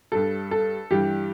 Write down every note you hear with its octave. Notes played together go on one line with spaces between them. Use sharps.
G2 G3 A4
A4
G2 E3 G3 G4